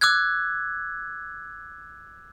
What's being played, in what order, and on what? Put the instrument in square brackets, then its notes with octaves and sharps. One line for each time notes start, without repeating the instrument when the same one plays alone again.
[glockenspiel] D6 E6 F#6 G#6